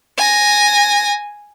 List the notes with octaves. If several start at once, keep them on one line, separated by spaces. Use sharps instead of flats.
G#5 A#6